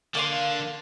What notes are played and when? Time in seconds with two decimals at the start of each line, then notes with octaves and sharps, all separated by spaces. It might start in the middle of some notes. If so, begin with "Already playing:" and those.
0.15 D3 A#3 F5 C6